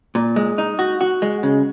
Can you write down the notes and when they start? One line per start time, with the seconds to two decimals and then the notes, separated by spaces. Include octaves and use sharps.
0.15 A#2
0.36 G#3
0.58 D#4
0.79 F#4
1.01 F#4
1.22 G#3
1.43 C#3